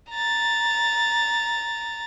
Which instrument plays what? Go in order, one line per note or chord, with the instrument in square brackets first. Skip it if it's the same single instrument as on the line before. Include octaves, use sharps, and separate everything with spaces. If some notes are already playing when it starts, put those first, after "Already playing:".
[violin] A#5 A6